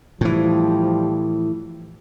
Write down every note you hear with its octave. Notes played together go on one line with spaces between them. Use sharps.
A2 E3 F3 G3